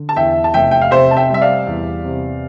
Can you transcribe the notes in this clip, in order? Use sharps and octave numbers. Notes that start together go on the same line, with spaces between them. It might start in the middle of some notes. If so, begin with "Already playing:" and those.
Already playing: D3
A5
E2 E5 G5
A5
F1 E5 G5
G5
F5
C3 C5 E5
A5
E5 G5
G3 E5
D5 F5
E2
C3